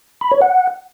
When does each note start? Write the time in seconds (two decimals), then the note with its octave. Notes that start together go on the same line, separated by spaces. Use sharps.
0.21 B5
0.31 C#5
0.42 F#5